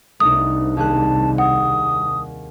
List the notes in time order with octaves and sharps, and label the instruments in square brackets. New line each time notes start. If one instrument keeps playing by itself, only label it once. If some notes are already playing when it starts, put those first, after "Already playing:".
[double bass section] C2 [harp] A3 D4 D#4 [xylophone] D#6
[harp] D#2 G#4 F#6 [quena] A5
[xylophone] F#5 [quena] D#6